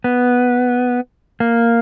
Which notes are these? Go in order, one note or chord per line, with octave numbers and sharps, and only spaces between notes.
B3
A#3